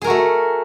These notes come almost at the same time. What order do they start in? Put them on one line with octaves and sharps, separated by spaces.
G#4 A#4 F#4 A3